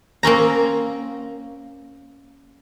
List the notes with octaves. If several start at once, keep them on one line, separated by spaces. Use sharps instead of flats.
A#3 C4 C#4 A#5